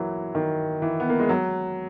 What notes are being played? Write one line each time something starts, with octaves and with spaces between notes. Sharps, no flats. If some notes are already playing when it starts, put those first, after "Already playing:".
Already playing: E3 F#3 A#3
D#3
E3
B3
A#3
G#3
F#3